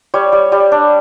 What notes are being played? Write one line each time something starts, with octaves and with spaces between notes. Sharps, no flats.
G3 C#5
G3
G3
D4